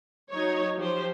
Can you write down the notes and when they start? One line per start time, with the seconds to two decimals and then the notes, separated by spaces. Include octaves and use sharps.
0.32 F#3 D#4 C#5
0.76 F3 G4 C5